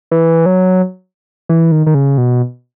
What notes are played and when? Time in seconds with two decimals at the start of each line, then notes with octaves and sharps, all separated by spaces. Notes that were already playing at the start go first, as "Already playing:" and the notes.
0.11 E3
0.46 F#3
1.49 E3
1.72 D#3
1.87 D#3
1.95 C#3
2.18 B2